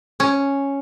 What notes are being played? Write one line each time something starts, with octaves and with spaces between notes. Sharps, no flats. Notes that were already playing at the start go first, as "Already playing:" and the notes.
C#4